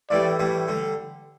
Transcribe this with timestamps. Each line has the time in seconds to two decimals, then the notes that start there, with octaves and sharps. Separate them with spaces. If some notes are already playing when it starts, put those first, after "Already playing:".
0.10 A2 E3 G3 D5
0.39 A2 E3 G3
0.68 D3 G3